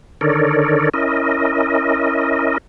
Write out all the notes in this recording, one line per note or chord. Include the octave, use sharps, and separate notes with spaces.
D3 D#3 A4 A#4 C#5 D5
C#4 E4 A#4 D#5